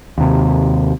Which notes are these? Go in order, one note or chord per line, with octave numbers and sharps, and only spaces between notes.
D#2 C3